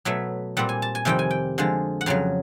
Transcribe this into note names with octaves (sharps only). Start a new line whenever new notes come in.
B2 F#3 A3 E5
A#2 G3 C4 F#5
G#5
A5
G#5
F2 C3 D#3 G3 C4 G5
G#5
G5
D3 F3 G#3
F#5
F2 C#3 F#3 F5